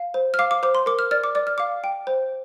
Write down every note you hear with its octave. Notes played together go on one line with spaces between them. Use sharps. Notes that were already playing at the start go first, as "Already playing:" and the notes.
Already playing: F5
C5
F6
F5 D6
D6
C5 D6
C6
A#4 D6
F6
D5 F6
D6
D5 D6
F6
F5 D6
G5
C5